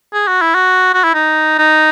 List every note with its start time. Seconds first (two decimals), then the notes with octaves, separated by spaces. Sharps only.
0.14 G#4
0.27 F#4
0.42 E4
0.55 F#4
0.94 F#4
1.04 E4
1.15 D#4
1.59 D#4